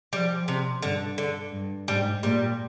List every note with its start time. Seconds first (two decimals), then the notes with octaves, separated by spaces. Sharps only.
0.13 F3 G3
0.48 C3
0.83 G2 D3
1.18 D3
1.53 G2
1.88 G#2 G3
2.23 A#2 G3